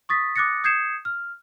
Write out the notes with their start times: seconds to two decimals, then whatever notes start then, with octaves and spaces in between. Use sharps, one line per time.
0.09 C#6 D#6 A6 B6
0.36 D6 D#6 F#6 A6 A#6 C#7
0.64 D#6 G6 G#6 C7 C#7 E7
1.05 F6